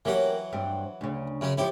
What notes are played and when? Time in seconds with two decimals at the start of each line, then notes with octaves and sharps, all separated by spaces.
0.05 E3 F#3 A#3 C#4 G4 F#5
0.53 G2 C4
1.01 D2 C#3
1.41 F#2 C#3 C#4
1.58 F3 C#4 E4 G4